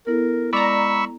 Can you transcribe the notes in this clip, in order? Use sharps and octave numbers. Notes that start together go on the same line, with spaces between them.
B3 E4 A4 A#4
G#3 D5 A#5 B5 C#6 E6